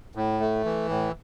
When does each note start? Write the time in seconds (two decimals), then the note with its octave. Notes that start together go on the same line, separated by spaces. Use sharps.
0.15 A2
0.40 A3
0.65 E3
0.89 A2